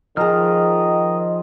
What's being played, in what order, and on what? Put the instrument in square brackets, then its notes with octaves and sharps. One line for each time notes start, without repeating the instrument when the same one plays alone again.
[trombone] D#3 [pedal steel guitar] F3 F6 [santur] G#4 A5 A#5 [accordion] D#5